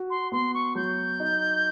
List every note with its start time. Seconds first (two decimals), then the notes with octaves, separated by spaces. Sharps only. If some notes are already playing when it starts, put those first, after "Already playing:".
Already playing: F#4
0.10 C6
0.32 B3 C6
0.54 C#6
0.75 F#3 G6
1.20 D#4